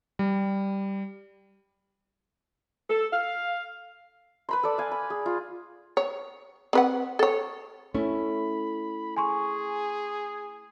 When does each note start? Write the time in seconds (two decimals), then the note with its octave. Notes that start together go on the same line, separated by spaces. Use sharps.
0.19 G3
2.90 A4
3.13 F5
4.49 B4 B5 C6
4.63 A4 D5
4.78 F5 G#5
4.91 B5
5.10 G#4
5.26 F4
5.97 C#5
6.73 C4 B4 F#5
7.19 A4 C#5
7.94 A3 C#4 E4 B5
9.17 G#4 G#5 C6 C#6